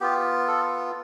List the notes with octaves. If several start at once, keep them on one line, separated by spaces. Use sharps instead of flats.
B3 F4 G4
A4